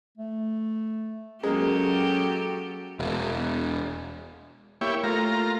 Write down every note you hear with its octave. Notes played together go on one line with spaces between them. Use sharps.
A3
F#3 G#3 A#3 C#4 G4 A4
E1
A#3 E4 G4 C#5
A3 F4 A#5